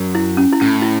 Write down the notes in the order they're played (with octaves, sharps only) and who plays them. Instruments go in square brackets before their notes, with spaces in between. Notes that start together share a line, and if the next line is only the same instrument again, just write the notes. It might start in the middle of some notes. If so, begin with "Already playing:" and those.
Already playing: [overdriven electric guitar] F#2
[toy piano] E4
C#4
E4
[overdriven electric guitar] A2 [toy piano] C#4
[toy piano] E4